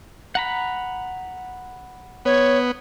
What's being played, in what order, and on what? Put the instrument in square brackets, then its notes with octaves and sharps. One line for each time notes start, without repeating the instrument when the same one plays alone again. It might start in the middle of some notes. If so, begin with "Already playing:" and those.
[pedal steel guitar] F#5 A#5 B5
[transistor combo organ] B3 [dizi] C#5